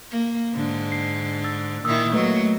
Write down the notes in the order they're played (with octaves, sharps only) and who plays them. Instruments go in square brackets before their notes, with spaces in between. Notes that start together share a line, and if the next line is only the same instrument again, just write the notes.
[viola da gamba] A#3
G#2 D3
[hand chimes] C7
E6 A6
[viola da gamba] A#2 D#3 E4 [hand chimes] D#6 E6
[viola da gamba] F#3 A#3 [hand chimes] A3 B4 D#5